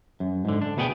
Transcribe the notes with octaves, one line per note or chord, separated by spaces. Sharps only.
F#2
G#2 D3
D4
D2 B2 B3 G#4 F#5 G5